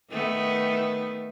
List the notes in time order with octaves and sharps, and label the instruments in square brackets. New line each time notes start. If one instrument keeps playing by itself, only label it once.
[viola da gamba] D#3 A3 B3